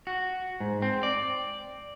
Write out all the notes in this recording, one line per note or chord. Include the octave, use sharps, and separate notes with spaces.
F#4
G#2
C4
D5